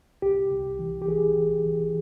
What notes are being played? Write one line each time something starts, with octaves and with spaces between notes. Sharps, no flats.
C2 G4
C2
E3
G4
E3 G#4
C2
E3